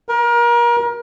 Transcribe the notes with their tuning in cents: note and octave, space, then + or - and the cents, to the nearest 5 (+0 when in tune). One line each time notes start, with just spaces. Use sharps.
A#4 +30